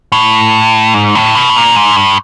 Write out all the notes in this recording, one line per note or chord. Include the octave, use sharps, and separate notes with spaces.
A2
G#2
A2
B2
A2
A#2
G#2
G2